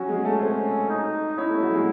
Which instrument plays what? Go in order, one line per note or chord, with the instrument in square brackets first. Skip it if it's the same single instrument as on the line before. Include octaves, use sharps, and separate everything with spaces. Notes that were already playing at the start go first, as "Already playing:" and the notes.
Already playing: [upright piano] F#3 F#4 [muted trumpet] C#4
[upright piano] G#3 G#4
A3 A4
[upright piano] C4 C5 [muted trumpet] C#4
[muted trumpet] D#4
[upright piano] D#5
[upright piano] C#4 C#5 [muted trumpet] E4
[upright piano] A3 A4
F#3 F#4
G#3 G#4